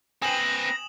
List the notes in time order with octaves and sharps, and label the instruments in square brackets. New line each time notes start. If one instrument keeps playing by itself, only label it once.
[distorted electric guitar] C4 B4 [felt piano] G5 G#5 [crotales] D#6 E7 F#7 [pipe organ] A#6